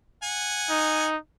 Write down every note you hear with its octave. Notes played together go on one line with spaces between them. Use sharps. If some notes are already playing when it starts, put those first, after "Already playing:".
F#5 G#5
D#4